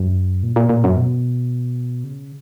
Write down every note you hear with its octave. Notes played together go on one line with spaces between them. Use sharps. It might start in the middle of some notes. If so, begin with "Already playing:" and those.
Already playing: F#2
A#2
A#2
A#2
F#2
B2
C#3